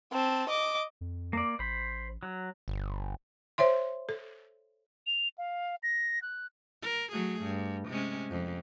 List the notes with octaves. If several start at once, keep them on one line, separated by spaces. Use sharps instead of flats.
C4 A5
D#5 D6
F2
A#3 D5
A1 C5 B5
F#3
G1
C5 C#5 E5 C6
A4
F7
F5
A#6
F#6
A#4
F#3 A3 G#4
G2
C3 G#3 C#4
F2